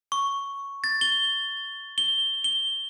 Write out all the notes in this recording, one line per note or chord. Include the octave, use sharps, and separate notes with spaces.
C#6
A6
G7
G7
G7